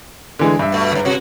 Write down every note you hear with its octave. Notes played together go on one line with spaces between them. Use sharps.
D3 E3 G#3
G2 E5
B2 A3
G#2 D3
C3 F#4